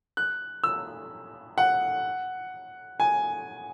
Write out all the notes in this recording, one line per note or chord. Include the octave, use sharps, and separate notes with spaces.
F#6
E6
F#5
G#5